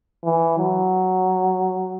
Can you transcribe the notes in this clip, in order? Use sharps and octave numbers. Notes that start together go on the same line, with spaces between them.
E3
F#3